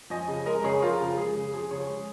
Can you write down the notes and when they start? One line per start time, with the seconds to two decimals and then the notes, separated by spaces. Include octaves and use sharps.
0.10 F3 D#5 G#5
0.28 C#3
0.46 G#3 A#4 D#5
0.63 C#3 G#4 C#5
0.82 F3 F4 A#4
1.00 C#3
1.17 G#3 G#4
1.35 C#3
1.53 F3 G#4
1.71 C#3 G#4 C#5
1.89 G#3